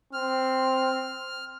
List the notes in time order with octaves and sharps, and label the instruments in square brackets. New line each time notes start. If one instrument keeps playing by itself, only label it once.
[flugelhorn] C4 [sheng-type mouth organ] F6